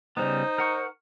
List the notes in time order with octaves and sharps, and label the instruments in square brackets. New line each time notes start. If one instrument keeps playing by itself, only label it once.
[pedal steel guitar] C#3 G3 B3 [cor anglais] D#4 [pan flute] C5
[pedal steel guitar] A#4 F#5 C#6